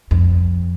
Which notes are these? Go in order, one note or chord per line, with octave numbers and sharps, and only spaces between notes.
F2